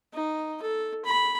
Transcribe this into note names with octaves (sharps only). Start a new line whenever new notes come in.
D#4
A4
B5